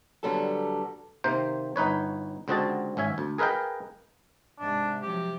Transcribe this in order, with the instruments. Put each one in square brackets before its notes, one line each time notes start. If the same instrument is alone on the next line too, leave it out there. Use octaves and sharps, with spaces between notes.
[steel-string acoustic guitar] D3 F#3 G3 B3 A4
[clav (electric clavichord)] C3 D#3 A#3 C5
G1 D#4 B4 C#5
C#2 D3 C4 F#4 D#5 A5
G#1 C#4 E5 G#5
D2
G#4 A#4 B4 D#5 F5 G5
[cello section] G#2 C3 [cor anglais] D4
[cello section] C3 F3 F#3 [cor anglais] G4